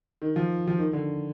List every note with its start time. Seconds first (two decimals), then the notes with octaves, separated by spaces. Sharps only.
0.22 D#3
0.36 F3
0.67 F3
0.79 D#3
0.93 D3